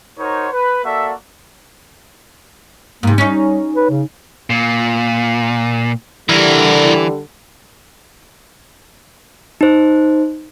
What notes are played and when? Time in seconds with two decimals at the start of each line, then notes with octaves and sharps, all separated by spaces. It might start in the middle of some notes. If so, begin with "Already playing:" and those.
0.18 D#4 F#4 A#4 C5 C#5
0.52 B4
0.84 A#3 F#4 A4 D5 E5
3.03 G#2 C3 A#3
3.18 G3 C#4 D#4
3.76 B4
3.90 C#3
4.50 A#2
6.29 D3 E3 G3 E4 A#4
9.61 D#4 C5